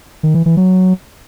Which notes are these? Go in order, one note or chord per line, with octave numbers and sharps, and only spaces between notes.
D#3
E3
E3
F#3